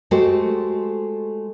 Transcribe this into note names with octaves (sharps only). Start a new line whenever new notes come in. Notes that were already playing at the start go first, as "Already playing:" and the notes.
G#3 A3 F#4 G4 A4 C5